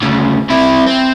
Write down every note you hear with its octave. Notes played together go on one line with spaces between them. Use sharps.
D2 C#3
C3 E4
C4